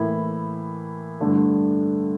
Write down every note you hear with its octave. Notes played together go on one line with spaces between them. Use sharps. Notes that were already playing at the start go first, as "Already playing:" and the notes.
Already playing: A2 E3 A#3 E4
G2 D3 A3